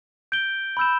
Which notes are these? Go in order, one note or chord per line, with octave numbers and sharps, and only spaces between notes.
G6 D7 G7
B5 E6 G6 E7